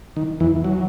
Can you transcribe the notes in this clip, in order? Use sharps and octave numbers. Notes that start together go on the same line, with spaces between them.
D#3
E2 E3
F#3